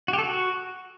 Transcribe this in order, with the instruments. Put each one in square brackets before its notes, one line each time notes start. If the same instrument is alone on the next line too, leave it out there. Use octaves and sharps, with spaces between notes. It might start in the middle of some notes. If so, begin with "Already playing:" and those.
[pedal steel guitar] F#4
G4
A4
F#4